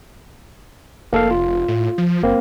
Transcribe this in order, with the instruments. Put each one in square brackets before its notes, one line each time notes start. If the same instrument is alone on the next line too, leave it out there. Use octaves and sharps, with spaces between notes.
[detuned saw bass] F1 [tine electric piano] A#3 A4 F5
[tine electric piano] F4
[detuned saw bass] A2
F3
[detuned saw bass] F#1 [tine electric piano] A#3 C4